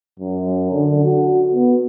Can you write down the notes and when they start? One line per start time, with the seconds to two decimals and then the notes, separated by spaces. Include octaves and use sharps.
0.20 F#2
0.72 D3
1.04 F#4
1.54 B3